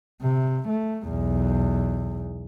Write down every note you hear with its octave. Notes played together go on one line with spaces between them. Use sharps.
C3
A3
B1 E2